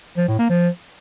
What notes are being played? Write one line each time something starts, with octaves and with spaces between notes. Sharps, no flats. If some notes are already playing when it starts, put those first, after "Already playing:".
F3
A2
A#3
F3